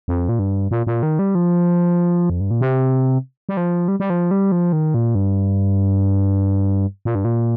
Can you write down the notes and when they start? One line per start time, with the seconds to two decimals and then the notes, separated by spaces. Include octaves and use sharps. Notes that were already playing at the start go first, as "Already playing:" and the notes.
0.08 F2
0.29 A#2
0.39 G2
0.71 A#2
0.87 A#2
1.03 D#3
1.19 G3
1.35 F3
2.30 F2
2.40 G2
2.51 A#2
2.61 C3
3.49 G3
3.57 F3
3.88 G3
4.00 G3
4.10 F3
4.31 G3
4.52 F3
4.73 D#3
4.94 A#2
5.15 G2
7.05 A#2
7.15 G2
7.25 A#2